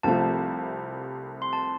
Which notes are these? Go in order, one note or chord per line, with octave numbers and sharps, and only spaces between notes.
C2 C3 F3 A3 F4 A5
C6
A5